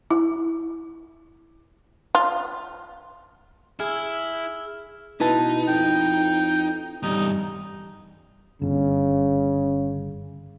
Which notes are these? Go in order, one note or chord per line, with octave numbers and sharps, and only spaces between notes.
E4
F4
E4 G#4 E6 F6
B2 D#4 E4 B4 A5
F2 G5
E2 G2 G3 D#4
G1 C#3